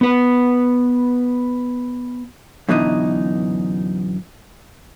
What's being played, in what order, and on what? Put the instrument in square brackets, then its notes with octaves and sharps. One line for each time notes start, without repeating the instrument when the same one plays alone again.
[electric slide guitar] B3 B4
[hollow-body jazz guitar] F#2 B2 D3 E3 D#4